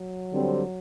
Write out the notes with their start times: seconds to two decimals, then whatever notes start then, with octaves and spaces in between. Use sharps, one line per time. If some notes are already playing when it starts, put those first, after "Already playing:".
Already playing: F#3
0.33 D3 G3 C4